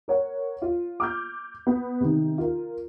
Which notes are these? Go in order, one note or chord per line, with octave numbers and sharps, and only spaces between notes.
A#4 C#5 F#5
F4
D6 F6 G6
B3
C3 D#3
F4 A#4